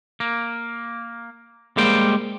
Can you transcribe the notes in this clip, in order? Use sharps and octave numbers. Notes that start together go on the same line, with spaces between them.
A#3
G3 G#3 A#3 C5 G5